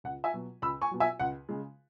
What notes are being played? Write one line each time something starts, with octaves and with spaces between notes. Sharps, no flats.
C#2 F#5
E5 G#5
B2 F#3
C#2 B5 E6
G#5 C#6
B2 F#3
E5 G#5
C#2 F#5
C#3 G#3